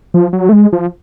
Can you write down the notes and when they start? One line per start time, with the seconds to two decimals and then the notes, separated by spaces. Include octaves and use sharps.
0.14 F3
0.33 F#3
0.49 A3
0.53 G#3
0.73 F3